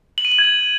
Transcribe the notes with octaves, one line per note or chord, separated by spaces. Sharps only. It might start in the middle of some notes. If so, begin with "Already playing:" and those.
F#7
D#7
F#7
G#6